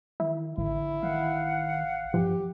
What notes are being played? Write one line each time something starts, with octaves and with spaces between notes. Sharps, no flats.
D#3 E4
A1 D3 E4
D#3 F5 F#5
G2 F3 G4